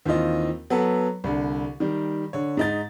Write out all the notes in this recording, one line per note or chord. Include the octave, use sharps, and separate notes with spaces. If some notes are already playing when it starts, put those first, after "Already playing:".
D#2 E3 C4 F4 D#5
F#3 B3 A4 B4
C2 D3
D#3 G3
D3 C#5
G#2 D#4 A6